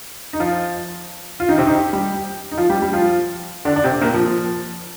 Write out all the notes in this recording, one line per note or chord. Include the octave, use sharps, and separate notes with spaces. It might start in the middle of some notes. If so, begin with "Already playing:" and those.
D#4
F3 F4
F4
D#3 D#4
C3 C4
D#3 D#4
G4
G3 G4
D#4
F3 F4
G3 G4
G3 G4
F3 F4
D3 D4
D4
C3 C4
A#2 A#3
F3
F3